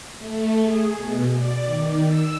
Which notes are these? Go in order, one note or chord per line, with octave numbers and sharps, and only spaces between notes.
A3
G#4
B2
D5
D#3
E6